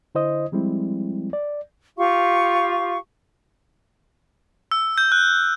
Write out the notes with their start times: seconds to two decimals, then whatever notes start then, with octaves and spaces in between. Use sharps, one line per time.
0.15 D3 E4 C5 D#5 D#6
0.52 F3 G3 G#3 C4 E4
1.33 D5
1.97 F4 G4 F5 C#6
4.72 E6
4.98 G6
5.12 F#6